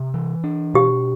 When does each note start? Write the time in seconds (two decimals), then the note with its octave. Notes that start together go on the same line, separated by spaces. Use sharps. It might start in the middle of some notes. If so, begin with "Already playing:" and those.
Already playing: C3
0.14 E3
0.44 D4
0.74 B2 G4